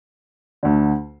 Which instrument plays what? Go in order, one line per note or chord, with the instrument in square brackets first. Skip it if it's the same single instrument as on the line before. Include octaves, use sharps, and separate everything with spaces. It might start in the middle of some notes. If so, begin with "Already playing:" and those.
[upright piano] D2 D3